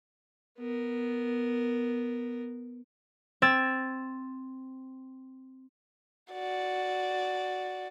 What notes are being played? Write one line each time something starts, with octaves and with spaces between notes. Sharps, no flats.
B3 A#4
C4 E6 G#6 A6
F#4 D5